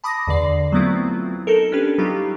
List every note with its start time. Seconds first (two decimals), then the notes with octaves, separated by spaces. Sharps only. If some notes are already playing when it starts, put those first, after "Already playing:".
0.04 A5 B5 D6 D#6 A#6
0.27 E2 D3 D5 C7
0.72 F#3 A3 B3 C4 E4 F4
1.47 D#4 A4 A#4
1.72 C#4 D4 G4 B4
1.98 F#3 G3 B3 D#4 F4 G4